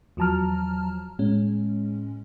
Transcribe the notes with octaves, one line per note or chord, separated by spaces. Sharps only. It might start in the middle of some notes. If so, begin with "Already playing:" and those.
E2 F3 F#3 A5 A#5 F6
A2 G#3 C#4